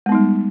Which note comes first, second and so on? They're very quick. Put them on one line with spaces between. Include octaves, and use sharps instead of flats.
G#3 B3 D#4 G3